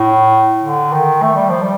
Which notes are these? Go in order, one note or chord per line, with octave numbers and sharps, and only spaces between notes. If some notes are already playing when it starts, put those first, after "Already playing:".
Already playing: A2
D3
D#3
A3
G3
F3
G3